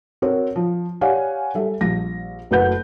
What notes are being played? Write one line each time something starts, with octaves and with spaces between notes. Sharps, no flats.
C4 F#4 A#4 C5 C#5
F3
G4 C#5 D5 F5 F#5 G#5
G3 A4 E5
A#1 G3 A#6
F#1 A3 F#4 B4 F#5 G6